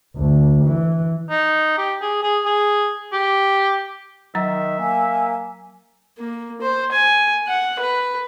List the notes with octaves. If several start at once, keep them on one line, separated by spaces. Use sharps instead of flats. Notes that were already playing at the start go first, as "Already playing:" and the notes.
D2
E3
D#4
G4
G#4
G#4
G#4
G4
D#3 F#3 E5 A#5
A#3 G#5
A#3
C5
G#5
F#5
B4